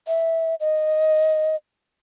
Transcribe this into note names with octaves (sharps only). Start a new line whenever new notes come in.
E5
D#5